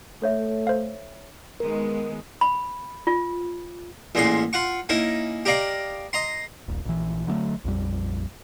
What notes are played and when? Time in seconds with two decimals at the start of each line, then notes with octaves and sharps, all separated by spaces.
0.22 A3 A4 C#5 E5
0.67 C5 F5
1.60 D#3 G#3 B3 A#4
2.41 B5
3.07 F4
4.15 A1 A#2 G#3 C#4 C6
4.53 F4 F#5 C#6
4.89 A#3 C#4 D#4 E4
5.45 G4 A#4 D5 D#5 F5
6.13 D#5 A#5 C6
6.68 D#1 A#1
6.85 A#1 E3
7.27 D3 F#3 G#3 A3
7.64 A#1 F2 G3